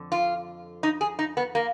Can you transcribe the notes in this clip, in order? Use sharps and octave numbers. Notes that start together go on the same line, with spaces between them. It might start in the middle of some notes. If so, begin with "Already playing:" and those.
Already playing: F2 D3
F4
D#4
G#4
D#4
B3
A#3